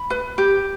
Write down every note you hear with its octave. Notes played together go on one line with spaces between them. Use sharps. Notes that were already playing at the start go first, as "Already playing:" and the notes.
Already playing: B5
B4
G4